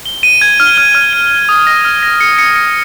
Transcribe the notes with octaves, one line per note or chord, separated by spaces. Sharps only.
G7
D#7
G#6
F6
F6
F6
D#7
D#7
D#6
A#6
F6
A#6
C#7
C#7
C#7